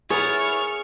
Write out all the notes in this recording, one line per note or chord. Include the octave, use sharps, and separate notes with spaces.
B3 E4 G#4 A#4 C#5 C#6 F6